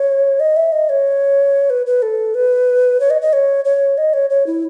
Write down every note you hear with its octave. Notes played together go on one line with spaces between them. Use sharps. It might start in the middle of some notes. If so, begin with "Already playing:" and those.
Already playing: C#5
D#5
E5
D#5
C#5
B4
B4
A4
B4
C#5
D#5
D#5
C#5
C#5
D#5
C#5
C#5
E4